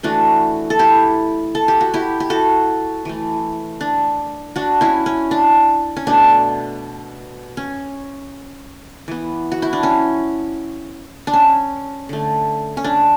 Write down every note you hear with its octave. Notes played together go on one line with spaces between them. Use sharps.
E3 A3 D4 F#4
A4
E4 G4
A4
G4
F#4
E4 G4
G4
F#4 A4
E3 A3
D4
D4 F#4
C#4 E4
C#4
D4
C#4
B2 A3 D4
C#4
E3 B3
F#4
E4
D4
C#4
D4
C#4
D3 A3
C#4
D4